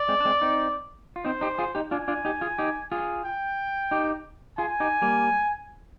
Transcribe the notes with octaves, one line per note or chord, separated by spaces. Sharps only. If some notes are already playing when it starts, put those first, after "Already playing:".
Already playing: D5
G#3 C4
D4
G#3 C4
C4 D#4
F4
C4 D#4 C5
D#4 G4
F4 G#4
D#4 G4
D4 F4 G#5
D4 F4
D#4 G4
F4 G#4
D#4 G4
F4 G#4
G5
D#4 G4
F4 G#4 G#5
D#4 G4
G3 A#3